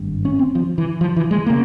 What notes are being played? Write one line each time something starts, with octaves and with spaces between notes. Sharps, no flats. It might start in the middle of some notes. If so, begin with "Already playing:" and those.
Already playing: G#1 G2
C#4
C4
F3
E3
F3
E3
G#3
C#3 A#3